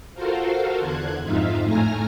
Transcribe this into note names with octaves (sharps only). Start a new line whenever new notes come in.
F4 F#4 A4 A#4 C5 F5
E2 D3 F#6 G#6
F2 G#2 D#4 F4 E5 F5
A2 A3 G#5 A#5 F6 A#6